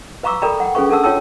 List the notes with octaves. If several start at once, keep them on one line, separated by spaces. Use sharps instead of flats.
B4 F5 A#5 C#6 D6 E6
A4 A#4 D5 G5 A#5 B5
F#5 G5
C#4 G#4 A4 B4 F5 C#6
D4 A4 A#4 F#5 A5 E6
F4 C#5 G5 A5 E6